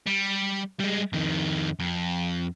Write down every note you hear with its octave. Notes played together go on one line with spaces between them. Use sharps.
G3
G3 G#3
F2 D#3
F2